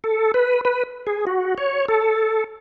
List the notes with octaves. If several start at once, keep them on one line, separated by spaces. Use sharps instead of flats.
A4
B4
B4
G#4
F#4
C#5
A4